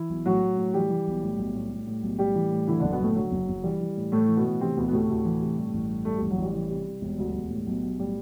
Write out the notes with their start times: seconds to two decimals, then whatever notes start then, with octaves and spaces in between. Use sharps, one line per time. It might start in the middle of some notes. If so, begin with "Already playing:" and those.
Already playing: E3 E4
0.09 B1
0.25 A2 F#3 F#4
0.42 A2
0.58 A2
0.74 E3 G3 G4
0.90 E3
1.07 B1
1.22 A2
1.38 B1
1.55 A2
1.70 A2
1.87 A2
2.03 B1
2.19 A2 G3 G4
2.35 E3
2.51 A2
2.67 D3 E3 E4
2.80 F#1 D3 D4
2.91 B2 B3
3.00 F#1 A2 A3
3.15 D3 F#3
3.31 F#1
3.48 F#1
3.63 E3 G3
3.80 E3
3.97 A2
4.12 A2 A3
4.28 E3
4.37 B2 B3
4.45 A2
4.61 C3 E3 C4
4.76 D2 B2 B3
4.88 B3
4.92 A2 C3 A3
5.09 D2
5.24 E3
5.41 C3
5.57 G2
5.73 A1
5.89 G2
6.05 G2 A3
6.18 A1 G3
6.31 F#3
6.37 A1
6.44 G3
6.53 E3
6.69 C3
6.86 C3
7.02 E1
7.19 D2
7.34 E1
7.50 A2
7.66 B1
7.83 B1
7.98 A2 G3